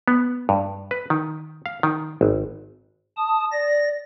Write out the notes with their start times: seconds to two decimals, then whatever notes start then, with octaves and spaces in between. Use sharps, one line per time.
0.08 B3
0.49 G2
0.91 B4
1.10 D#3
1.66 F5
1.83 D#3
2.21 G#1
3.17 A5 D#6
3.52 D5 A#6